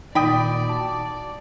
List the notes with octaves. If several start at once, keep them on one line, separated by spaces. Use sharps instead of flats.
A#2 D#3 D#4 D5 D#5 G5 B5
F#4 A5